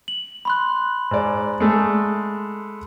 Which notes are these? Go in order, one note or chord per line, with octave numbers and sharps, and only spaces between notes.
F#7
B5 C6 F#6
G#2 D5
G#3 A3 A4